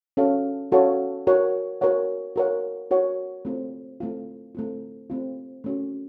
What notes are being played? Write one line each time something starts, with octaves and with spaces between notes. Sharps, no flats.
C#4 F#4 A4 C#5 F5
C#4 F#4 A4 C#5 F5
F#4 A#4 C#5 F#5
F#4 A#4 C#5 F#5
F#4 A#4 C#5 F#5
F#4 A#4 C#5 F#5
A3 C4 F4
A3 C4 F4
A3 C4 F4
A3 C4 F4
A3 C#4 F#4